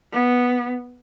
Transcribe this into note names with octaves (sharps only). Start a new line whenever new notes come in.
B3